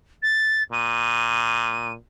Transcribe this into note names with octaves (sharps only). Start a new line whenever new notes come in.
A6
A#2 D#7